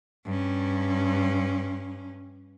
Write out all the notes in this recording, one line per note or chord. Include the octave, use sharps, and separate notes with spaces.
G2 C#4